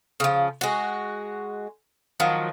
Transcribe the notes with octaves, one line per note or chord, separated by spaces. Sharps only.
C#3 F3
G#3 F#4
D#3 F3 F#3